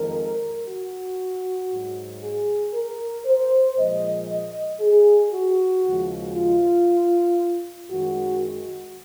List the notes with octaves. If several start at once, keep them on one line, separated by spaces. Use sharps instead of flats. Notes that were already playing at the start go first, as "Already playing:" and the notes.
Already playing: F2 D#3 G#3 A#4
F#4
G#2 F#3
G#4
A#4
C5
A#2 F3 G#3 D#5
D#5
G#4
F#4
D#2 C#3 F3 G#3
F4
F#2 D#3 G#3 F#4
F#4